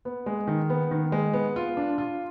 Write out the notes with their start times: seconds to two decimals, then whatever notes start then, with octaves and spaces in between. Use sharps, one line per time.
0.05 B3
0.26 G#3
0.47 D#3
0.70 B3
0.91 D#3
1.12 G#3
1.33 B3
1.56 F4
1.77 D4
1.98 F4